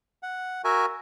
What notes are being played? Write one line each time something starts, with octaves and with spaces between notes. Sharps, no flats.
F#5
F#4 A#4 E5 G#5